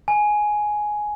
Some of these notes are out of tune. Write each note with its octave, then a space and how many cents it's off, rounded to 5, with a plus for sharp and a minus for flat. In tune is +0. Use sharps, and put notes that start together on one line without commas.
G#5 +10